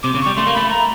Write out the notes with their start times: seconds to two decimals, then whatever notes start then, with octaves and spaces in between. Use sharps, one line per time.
0.03 C3 D6
0.15 C#3
0.21 C#6
0.26 G3
0.37 A3 C6
0.47 A#3
0.54 A3 B5
0.70 A#5